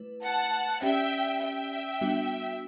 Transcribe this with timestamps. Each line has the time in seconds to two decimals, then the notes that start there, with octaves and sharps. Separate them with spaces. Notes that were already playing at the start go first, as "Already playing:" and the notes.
Already playing: A3 E4 B4
0.22 F#5 A5
0.82 C#4 G4 D5 E5 G5
1.42 E5 G5
2.01 G3 B3 D4 F#4